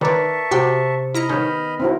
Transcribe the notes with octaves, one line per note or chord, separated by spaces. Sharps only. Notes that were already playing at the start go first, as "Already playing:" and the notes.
D#3 A#4 B4 C#5 D5 E5 A5 C#6
C3 F#4 G5 C6
E4 D#5 A#5 B5 F6 C#7
D#3 B3 C#4
C4 E4 F#4 A#4